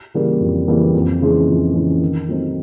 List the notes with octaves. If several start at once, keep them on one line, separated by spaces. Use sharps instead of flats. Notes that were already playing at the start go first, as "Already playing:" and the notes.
C#3 E3 G3 A#3
F2
C#3 E3 G3 A#3
F2
C#3 E3 G#3 C#4
F2
C#3 E3 G#3 C#4
D#3
F#3 A3 C4 D#4